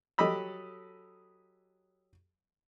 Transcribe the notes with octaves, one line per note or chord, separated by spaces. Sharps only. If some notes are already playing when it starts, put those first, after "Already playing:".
F#3 G4 A4 D#5 B5 E6